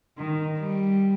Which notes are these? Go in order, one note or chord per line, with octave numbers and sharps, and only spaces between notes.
D#3
G3